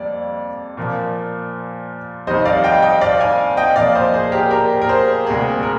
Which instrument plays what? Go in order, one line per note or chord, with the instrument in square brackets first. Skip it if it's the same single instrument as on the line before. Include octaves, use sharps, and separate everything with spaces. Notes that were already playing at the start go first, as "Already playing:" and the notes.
Already playing: [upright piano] F2 G3 A#3 D5
A#2 F3 A#3
F2 D#3 G3 C5 D#5
D5 F5
D#5 G5
D#5 G5
D5 F5
F5 G#5
D#5 G5
A#2 F3 A#3 D5 F5
C5 D#5
G#4 C5
G4 A#4
G4 A#4
A#4
G#4 C5
D2 C3 G3 A#3 G#4
A#4